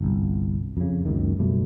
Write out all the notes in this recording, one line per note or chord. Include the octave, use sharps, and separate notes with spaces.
G1 C2
F2 C#3
F#1 C#2 F#2 D#3
F#1 B2 G3 A3